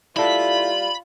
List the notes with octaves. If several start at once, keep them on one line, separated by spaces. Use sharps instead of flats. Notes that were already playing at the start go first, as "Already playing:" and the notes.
G3 A#3 E4 F4 A4 B5